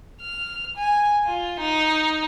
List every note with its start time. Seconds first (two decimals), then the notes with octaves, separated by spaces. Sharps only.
0.22 F6
0.76 G#5
1.25 F4
1.60 D#4